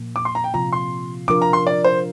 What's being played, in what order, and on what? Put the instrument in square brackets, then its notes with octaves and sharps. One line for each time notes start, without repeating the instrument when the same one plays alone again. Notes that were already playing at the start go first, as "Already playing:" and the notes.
Already playing: [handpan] A#2 F3 A#3
[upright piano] D6
C6
A#5
G5
[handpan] C3 F3 C4 F4 [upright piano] A#5
[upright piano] C6
[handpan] C3 F3 D4 F4 A#4 [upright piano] D6
[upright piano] A#5
C6
D5
C5